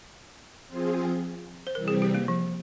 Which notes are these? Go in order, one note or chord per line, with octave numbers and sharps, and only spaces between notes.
F3 C4 F4 G#4
C5
C3 E3 G3 C4 A#4
G#4
G4
A#3
F3